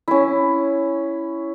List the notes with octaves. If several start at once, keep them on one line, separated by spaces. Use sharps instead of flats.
C#4 E4